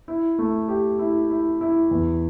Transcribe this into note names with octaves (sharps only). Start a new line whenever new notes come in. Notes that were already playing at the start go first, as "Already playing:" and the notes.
E4
A3
G4
E4
E4
E4
E2